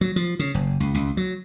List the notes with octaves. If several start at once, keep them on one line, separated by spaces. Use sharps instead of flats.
F#3
F3
C#3
F#1
C#2
C#2
F#3